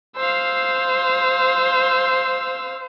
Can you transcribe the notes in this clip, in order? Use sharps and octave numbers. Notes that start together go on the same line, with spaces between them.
C5 F5 E6